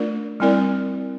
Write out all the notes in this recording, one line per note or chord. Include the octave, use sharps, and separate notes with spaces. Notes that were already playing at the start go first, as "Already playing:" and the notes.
Already playing: A3 D4 F4 A#4 D5
G3 C4 E4 A#4 D5